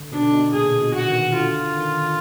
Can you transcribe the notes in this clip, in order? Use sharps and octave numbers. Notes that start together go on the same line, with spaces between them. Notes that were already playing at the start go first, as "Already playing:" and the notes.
Already playing: D3
B2 D4
D3
B2
A#2 G#4
B2
F#4
D#3
D3 F4
D#3